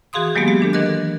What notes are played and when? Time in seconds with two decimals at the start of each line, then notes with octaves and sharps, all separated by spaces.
0.13 E3 F#4 G#4 F5 C6 D#6
0.35 D#3 F#3 G#3 A#3 B3 G4
0.48 G4
0.60 E3 D4 A4
0.73 E3 A#4 D#5 F#6
0.86 A4